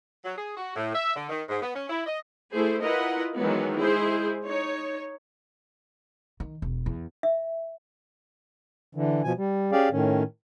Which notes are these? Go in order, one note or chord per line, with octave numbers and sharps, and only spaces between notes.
F#3
G#4
F#4
A2
E5
D3
D#3
G#2
B3
C#4
E4
D#5
A3 E4 G#4 C5
E4 F4 A#4 B4 D#5 F#5
D#3 E3 F#3 G#3 B3
G#3 E4 G#4 C5
D#4 C#5
D#3
E1
E2
E5
D3 E3
B2 F3 G#5
G3
C#4 G4 G#4 D5 F5
A2 D#3 C#4